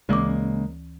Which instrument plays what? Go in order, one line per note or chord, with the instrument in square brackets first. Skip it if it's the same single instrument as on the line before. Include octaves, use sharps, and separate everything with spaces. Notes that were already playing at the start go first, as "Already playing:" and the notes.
[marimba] D2 E3 D6 [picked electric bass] C#3 G#3 A#3